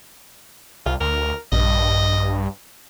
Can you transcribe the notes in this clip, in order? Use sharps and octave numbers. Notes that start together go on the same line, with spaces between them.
C2 F4
D2 A#4
A#1 G2 D#5